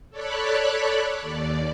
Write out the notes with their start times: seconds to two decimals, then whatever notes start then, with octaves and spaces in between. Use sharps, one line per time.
0.10 A4 C#5 D5 B5 F#6
1.20 D#2 D5